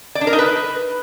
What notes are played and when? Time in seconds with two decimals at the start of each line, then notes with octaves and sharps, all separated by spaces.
0.15 D5
0.21 D4
0.27 A#4
0.33 D#4
0.39 B4